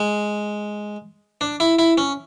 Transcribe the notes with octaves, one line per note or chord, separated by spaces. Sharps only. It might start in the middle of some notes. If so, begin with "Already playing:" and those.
Already playing: G#3
D4
E4
E4
C#4